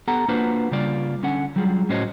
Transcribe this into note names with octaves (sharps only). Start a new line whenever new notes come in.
B3 G4 A4 F#5 A#5
A#3 D4 F4 F#4 B4 C5
C#3 G3 A#3 F4 D5
D3 C#4 F#5
F#3 G3 F4 G#4
A2 C#4 F#4 C5 C#5 D#5